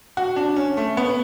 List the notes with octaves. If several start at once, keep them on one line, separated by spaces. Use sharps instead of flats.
F#4
D4
C#4
A3
B3